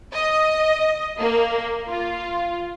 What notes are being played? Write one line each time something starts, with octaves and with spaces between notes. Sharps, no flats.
D#5
A#3
F4